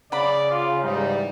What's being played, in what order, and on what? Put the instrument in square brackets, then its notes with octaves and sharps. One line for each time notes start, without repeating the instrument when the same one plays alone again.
[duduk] C#3 [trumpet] D5 [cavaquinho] F#5 B5
[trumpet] F4
[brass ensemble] G#2 E3 G3 [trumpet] D#4